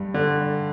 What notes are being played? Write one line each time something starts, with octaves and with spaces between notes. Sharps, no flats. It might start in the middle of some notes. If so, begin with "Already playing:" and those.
Already playing: G2 G3
D3